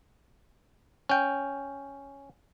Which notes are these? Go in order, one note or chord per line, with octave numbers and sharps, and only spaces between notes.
C#4 G5